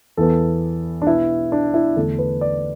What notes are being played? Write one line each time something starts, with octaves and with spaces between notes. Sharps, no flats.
E2 E3 B3 A4
D4
B2 B3 E4
D4
E4
E2 D3 A3 A4
B4
D5